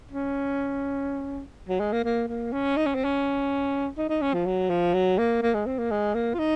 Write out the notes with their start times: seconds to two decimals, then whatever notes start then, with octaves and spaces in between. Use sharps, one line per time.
0.11 C#4
1.68 F#3
1.80 G#3
1.92 A#3
2.04 A#3
2.28 A#3
2.53 C#4
2.77 D#4
2.86 C#4
2.95 C4
3.04 C#4
3.97 D#4
4.09 D#4
4.21 C#4
4.34 F3
4.46 F#3
4.69 F3
4.94 F#3
5.18 A#3
5.42 A#3
5.54 G#3
5.66 C4
5.79 A#3
5.91 G#3
6.14 A#3
6.34 F4
6.39 D#4